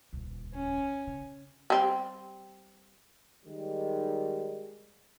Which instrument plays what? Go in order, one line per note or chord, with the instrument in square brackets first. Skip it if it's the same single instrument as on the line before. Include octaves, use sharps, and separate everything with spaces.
[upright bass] D#1 C#2
[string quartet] C#4 G#5
[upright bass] C#3
[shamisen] G3 C4
[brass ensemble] D#3 G3 G#3